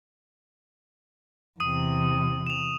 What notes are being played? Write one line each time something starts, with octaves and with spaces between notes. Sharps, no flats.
E2 C3 D#6 D#7
E7 F7